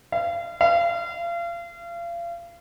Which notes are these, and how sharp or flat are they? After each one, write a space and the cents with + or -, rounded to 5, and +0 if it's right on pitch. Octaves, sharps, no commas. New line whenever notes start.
F5 -35
F5 -35